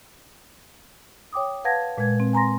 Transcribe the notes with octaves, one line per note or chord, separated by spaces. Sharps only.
C#5 G5 D6 D#6
B4 F5 F#5 A5 G#6 A#6
A#2 G#3 B4 G#6
C4
G#5 A#5 C6 A#6